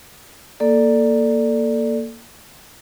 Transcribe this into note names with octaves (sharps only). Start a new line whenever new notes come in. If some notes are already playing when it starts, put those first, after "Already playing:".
A#3 A4 D5